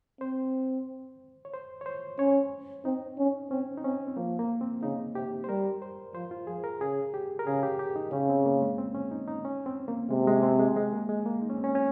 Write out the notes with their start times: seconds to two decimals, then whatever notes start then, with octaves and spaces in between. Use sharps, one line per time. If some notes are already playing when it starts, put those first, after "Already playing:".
0.21 C4 C5
1.45 C#5
1.54 C5
1.81 C#5
1.86 C5
2.19 C#4 C#5
2.85 C4 D#4
3.18 C#4
3.50 C4 C#4
3.78 D#4
3.84 C4 C#4
4.07 C4
4.17 F3 A#3
4.39 A#3
4.61 C4
4.82 C#3 D#4
5.15 C3 G4
5.44 C5
5.49 G3 A#4
5.82 C5
6.14 F3 C5
6.31 F4
6.47 F3 G#4
6.64 A#4
6.80 C#3 G#4
7.14 G4
7.39 A#4
7.46 C#3 G#4
7.63 G4
7.79 G4
7.96 D#4
8.12 C#3 C#4
8.29 C4
8.46 A#3
8.62 G#3
8.78 C4
8.95 C#4
9.11 D#4
9.28 D#4
9.45 C#4
9.66 C4
9.88 A#3
10.10 C3 G#3
10.27 G#3
10.43 C4
10.60 G#3
10.76 G#3
10.92 A#3
11.09 G#3
11.26 A#3
11.42 D#4
11.50 C#4
11.57 C4
11.64 C#4
11.75 C#4